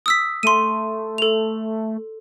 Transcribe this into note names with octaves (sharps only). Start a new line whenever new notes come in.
D#6 E6 B6
A3 C6 D#7
A4 F7